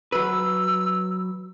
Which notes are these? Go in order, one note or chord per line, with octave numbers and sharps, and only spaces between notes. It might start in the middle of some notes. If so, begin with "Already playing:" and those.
F#3 B4 E6